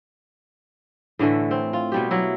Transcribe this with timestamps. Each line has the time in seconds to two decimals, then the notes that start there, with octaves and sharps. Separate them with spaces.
1.19 A2 D3 E3 A3
1.51 C4
1.73 F4
1.92 B2 G3 G4
2.11 F#3 E4